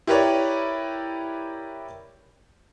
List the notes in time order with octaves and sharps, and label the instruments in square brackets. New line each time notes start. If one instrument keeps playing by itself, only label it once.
[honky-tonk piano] E4 G4 A#4 B4 C#5 D5